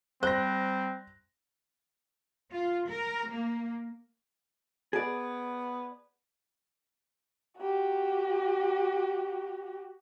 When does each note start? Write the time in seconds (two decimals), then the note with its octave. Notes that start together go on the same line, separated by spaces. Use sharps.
0.23 G3 C4 C5 F#6 A#6
2.52 F4
2.89 A#4
3.30 A#3
4.93 B3 G#4 B4 D5
7.58 F#4 G4